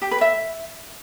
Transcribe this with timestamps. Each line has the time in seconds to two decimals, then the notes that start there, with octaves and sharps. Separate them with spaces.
0.02 G4
0.11 B4
0.21 E5